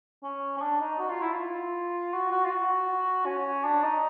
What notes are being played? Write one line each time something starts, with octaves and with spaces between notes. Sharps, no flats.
C#4
C#4
D4
D#4
F#4
F4
E4
F4
F#4
F#4
F4
F#4
C#4
D4
D#4